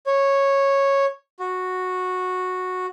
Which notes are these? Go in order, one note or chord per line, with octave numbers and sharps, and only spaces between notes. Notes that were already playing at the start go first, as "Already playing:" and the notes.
C#5
F#4